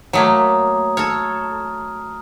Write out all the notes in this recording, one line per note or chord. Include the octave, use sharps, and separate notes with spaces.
F#3 A3 A#3 A#5 D#6 G#6
A4 C#5 F6